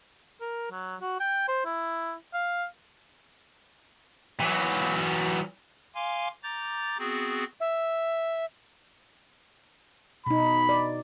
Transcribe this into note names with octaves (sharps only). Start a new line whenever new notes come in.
A#4
F#3
F#4
G5
C5
E4
F5
E3 F#3
F5 G#5 C6 D6
A#5 D6 G6 A6
B3 C4 F#4 G#4
E5
B2 D#4 B5
D5